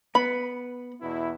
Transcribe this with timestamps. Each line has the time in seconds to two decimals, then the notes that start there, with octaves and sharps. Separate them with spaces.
0.15 B3 B5
1.02 E2 B2 E4